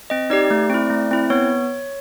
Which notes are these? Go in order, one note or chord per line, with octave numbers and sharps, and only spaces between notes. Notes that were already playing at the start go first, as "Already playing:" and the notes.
C4 D#5
D#4 G4 D5
A3
C4 E4
A3
C4 E4
B3 C#5